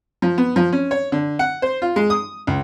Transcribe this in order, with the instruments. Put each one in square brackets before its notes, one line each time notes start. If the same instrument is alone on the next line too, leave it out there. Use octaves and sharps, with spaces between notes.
[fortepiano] F3
B3
F3
C#4
C#5
D3
F#5
C5
F4
G#3
D#6
C#2